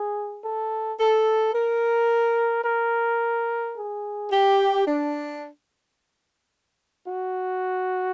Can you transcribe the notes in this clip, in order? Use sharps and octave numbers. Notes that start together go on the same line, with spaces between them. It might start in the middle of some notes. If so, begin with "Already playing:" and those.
Already playing: G#4
A4
A4
A#4
A#4
G#4
G4
D4
F#4